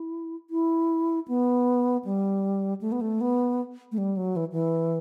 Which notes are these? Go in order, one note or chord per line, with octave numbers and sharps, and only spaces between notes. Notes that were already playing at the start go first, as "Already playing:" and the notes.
Already playing: E4
E4
B3
G3
A3
B3
A3
B3
A3
G3
F#3
E3
E3